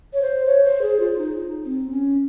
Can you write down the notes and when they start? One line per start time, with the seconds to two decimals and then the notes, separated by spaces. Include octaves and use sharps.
0.13 C#5
0.22 C5
0.46 C#5
0.64 C5
0.82 G#4
1.00 F4
1.18 D#4
1.66 C4
1.90 C#4